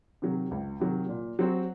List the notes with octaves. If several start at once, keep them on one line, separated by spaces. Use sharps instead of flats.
C3 D#3 F#3
C#2
C3 D#3 F#3
A#2
F#3 C4 F#4